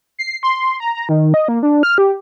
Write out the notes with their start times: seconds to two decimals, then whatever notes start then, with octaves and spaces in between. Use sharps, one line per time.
0.19 C7
0.43 C6
0.80 A#5
0.95 A#5
1.09 D#3
1.34 D#5
1.48 A#3
1.63 D4
1.83 F6
1.98 G4